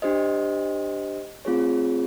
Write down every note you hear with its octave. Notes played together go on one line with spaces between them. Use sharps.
D4 G4 C5 D#5
A3 C4 F4 G#4 C#5